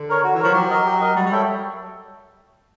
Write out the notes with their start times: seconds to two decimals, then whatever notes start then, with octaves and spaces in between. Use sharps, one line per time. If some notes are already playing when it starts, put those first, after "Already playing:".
Already playing: D3
0.09 A#4 C#5
0.24 F#4
0.34 E3
0.40 F3 A#4 C#5
0.54 F#3 G4
0.70 A#4 D#5
0.85 G4
1.01 A#4 D#5
1.16 G3 F#4
1.26 G3
1.31 A4 C#5 E5 G5